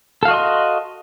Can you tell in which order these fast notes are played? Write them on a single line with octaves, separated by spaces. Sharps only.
A4 F5 F#4 D#5 C6